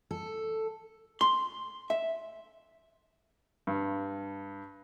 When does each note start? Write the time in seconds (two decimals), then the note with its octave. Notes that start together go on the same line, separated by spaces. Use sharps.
0.11 A4
1.21 C6
1.90 E5
3.67 G2